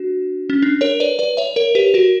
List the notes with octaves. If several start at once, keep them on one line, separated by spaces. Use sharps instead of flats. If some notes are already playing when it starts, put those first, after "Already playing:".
Already playing: D4 F#4
C#4
D4
A#4 C#5
B4 D5
B4 D5
C#5 E5
A#4 C#5
G4 B4
F#4 A#4